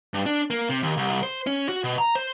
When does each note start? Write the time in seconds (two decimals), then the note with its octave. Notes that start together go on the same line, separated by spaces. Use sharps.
0.14 G2
0.26 D4
0.50 A#3
0.70 C3
0.83 D#2
0.97 C2
1.23 C5
1.47 C#4
1.69 F#4
1.84 B2
1.98 A#5
2.15 C5